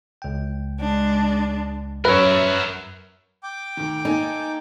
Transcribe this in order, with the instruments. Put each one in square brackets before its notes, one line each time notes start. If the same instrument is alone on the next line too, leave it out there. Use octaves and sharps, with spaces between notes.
[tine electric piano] C#2 G5
[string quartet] G#3 D4
[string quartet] F#2 [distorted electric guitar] A#4 E5 [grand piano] B4 C#5
[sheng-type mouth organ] G5 D6
[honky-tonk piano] D2 D#3
[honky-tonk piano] A#3 A4 G#5 [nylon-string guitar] D#4